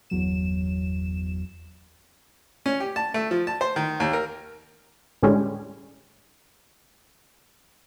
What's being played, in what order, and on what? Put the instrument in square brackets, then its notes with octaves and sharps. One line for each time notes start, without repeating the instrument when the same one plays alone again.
[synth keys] G1 E2 F#3 E7
[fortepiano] C#4
G4
A5
A3
F3
A5
C5
D#3
D#2
A#4
[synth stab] A2 D3 G3 G#3 C#4